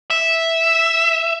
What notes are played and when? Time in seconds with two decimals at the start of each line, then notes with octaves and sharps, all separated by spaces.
0.10 E5